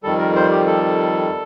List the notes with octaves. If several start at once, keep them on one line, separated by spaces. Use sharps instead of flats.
F2 D#3 G3 A4
A#4
C5
G4
A4